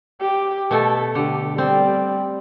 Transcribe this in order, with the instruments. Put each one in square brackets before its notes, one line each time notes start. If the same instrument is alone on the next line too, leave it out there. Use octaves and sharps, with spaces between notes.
[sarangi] G4
[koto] B2 A3 [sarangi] A4
[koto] D3 [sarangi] G4
[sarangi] G3 [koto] C4